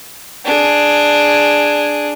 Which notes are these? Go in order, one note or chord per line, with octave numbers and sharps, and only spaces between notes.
D4 G#4